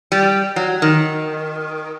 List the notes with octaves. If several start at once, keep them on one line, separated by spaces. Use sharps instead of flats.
G3
F#3
D#3